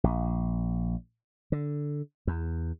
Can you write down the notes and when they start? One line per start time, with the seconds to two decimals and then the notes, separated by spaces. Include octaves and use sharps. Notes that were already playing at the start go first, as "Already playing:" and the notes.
0.04 A#1
1.52 D3
2.27 E2